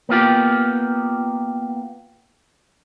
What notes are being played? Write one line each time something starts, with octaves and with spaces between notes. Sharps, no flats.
A#3 B3 F4 G4